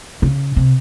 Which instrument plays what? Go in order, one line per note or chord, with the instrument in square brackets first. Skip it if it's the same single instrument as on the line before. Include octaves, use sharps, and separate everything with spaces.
[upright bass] C#3
C3